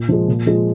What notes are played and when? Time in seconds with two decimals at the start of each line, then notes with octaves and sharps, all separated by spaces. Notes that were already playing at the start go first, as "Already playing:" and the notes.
Already playing: A#2
0.09 F3 G#3
0.28 A#2
0.47 F3 G#3